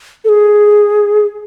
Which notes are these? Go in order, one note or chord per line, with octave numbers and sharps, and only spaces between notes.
A4
G#4